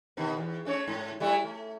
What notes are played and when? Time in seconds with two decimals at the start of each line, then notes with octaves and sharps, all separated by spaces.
0.17 B2 D#3 B3
0.37 E2
0.65 A3 C#4 C#5
0.88 G#2
1.20 G3 A3 E4
1.44 A3